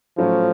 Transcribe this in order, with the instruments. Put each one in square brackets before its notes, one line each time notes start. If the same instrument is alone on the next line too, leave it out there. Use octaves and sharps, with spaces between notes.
[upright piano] A2 F#3 A3 C#4 [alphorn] F3